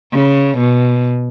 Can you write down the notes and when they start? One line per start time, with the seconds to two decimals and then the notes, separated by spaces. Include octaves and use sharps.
0.13 C#3
0.58 B2